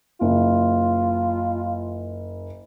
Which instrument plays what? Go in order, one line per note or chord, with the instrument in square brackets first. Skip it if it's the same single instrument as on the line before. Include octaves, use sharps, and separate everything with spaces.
[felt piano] F#1 [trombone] F4